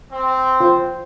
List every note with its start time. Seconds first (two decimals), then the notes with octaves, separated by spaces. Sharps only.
0.12 C4
0.60 F4 C5